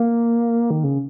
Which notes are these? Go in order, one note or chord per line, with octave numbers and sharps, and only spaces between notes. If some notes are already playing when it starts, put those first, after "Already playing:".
Already playing: A#3
D#3
C#3